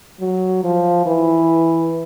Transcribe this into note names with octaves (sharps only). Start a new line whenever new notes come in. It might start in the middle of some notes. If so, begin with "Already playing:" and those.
F#3
F3
E3